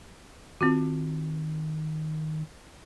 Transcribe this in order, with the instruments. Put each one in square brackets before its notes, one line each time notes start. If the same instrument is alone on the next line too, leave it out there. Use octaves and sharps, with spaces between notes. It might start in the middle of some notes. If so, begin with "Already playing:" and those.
[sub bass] D#3 [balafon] C4 F4 F#4